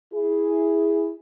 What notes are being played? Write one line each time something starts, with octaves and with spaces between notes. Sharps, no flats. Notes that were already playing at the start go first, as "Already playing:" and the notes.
E4 G#4